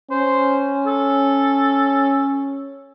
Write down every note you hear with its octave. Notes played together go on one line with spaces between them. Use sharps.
C#4 C5
A4